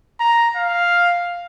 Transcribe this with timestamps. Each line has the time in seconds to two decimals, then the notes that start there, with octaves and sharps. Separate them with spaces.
0.20 A#5
0.56 F5